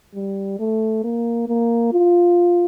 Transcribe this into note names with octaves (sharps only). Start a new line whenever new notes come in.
G3
A3
A#3
A#3
F4